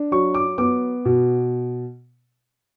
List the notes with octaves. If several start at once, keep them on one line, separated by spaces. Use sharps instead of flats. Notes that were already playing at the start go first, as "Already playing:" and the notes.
Already playing: D4
F#3 C#6
D6
B3 D6
B2